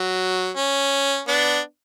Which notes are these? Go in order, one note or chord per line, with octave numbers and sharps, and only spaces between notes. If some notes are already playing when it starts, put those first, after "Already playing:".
Already playing: F#3
C#4
B3 D4